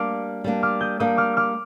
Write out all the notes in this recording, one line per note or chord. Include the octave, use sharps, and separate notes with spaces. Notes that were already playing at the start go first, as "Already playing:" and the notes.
Already playing: G3 A#3 D4 D6 F6
G3 A#3 D4
D6 F6
D#6 G6
G3 A#3 D4 D#6 G6
D6 F6
D6 F6